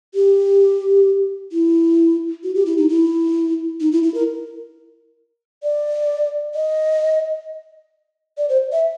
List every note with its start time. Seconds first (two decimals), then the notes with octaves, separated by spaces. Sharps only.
0.14 G4
1.52 E4
2.43 F#4
2.55 G4
2.66 E4
2.77 D#4
2.89 E4
3.81 D#4
3.92 E4
4.03 E4
4.14 A#4
5.63 D5
6.55 D#5
8.38 D5
8.49 C5
8.72 E5